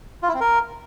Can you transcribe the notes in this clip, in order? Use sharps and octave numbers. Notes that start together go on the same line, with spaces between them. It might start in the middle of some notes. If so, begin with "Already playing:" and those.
F4
E4
C4
A#4